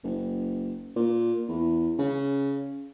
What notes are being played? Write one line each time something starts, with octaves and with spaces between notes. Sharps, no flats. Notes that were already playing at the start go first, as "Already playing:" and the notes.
F#1
A#2
E2
C#3